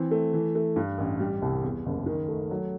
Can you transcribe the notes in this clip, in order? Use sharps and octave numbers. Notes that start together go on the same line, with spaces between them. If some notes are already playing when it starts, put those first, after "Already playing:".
Already playing: E3 C4
A3
E3
A3
G2
A1
G3
C2
E2
F#1
D#3
A3
F#3